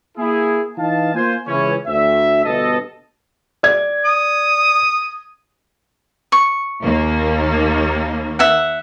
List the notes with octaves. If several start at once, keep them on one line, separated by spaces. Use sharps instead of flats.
A#3 E4 G#4
E3 D#4 D#5 F5 A5
A#3 F4 C5 G#5
C#2 E3 C#4 C#5
D2 E5
G1 B2 A4 D#5
D5 G#6
D#6
C#6
D#2 A#3
E5 F#5